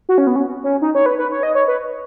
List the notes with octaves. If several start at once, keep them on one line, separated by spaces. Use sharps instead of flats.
F#4
C#4
B3
C#4
C#4
D#4
C#5
B4
B4
C#5
D#5
C#5
B4